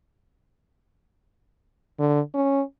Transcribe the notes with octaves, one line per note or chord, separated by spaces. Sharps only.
D3
C#4